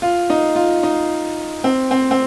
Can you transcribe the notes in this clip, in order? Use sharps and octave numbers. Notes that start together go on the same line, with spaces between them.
F4
D#4
F4
D#4
C4
C4
C4